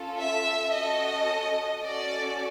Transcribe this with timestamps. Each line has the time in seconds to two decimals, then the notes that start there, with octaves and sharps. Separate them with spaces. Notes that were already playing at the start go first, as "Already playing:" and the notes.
Already playing: C#4 F4 A4
0.19 E5
0.74 C#4 F#4 A4 D#5
1.83 C#4 F#4 A4 D5